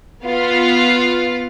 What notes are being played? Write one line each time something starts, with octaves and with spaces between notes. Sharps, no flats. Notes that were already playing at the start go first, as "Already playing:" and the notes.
B3 F4 F5